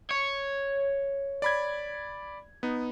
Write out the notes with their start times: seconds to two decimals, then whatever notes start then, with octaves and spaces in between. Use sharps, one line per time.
0.11 C#5
1.42 D5 B5 G#6
2.63 B3 D#4